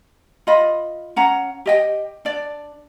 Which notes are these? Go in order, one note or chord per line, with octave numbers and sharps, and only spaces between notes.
F4 D#5 B5
C#4 F#5 A#5
G4 D#5 G5
D4 D5